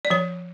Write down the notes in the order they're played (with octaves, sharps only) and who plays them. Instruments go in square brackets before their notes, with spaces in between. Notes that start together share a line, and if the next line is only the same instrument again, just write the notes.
[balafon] D5
F3 C#5